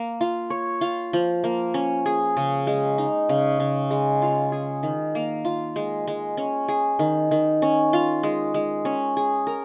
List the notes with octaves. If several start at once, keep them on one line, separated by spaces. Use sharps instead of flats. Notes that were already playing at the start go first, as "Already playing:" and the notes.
Already playing: A#3
F4
C#5
F4
F3
A#3
C#4
G#4
C#3
G#3
D#4
C#3
C#3
G#3
F4
G#4
D#3
A#3
F4
G#3
G#3
C#4
G#4
D#3
D#3
C#4
F4
G#3
G#3
C#4
G#4
A#4